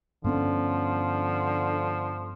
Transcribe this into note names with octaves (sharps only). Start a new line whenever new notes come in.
G2 D3 F3 B3 C#4